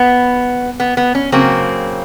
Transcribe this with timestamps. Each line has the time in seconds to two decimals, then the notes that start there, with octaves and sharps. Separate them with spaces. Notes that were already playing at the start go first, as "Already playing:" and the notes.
Already playing: B3
0.80 B3
0.97 B3
1.15 C#4
1.32 C#3 F#3 A#3 C4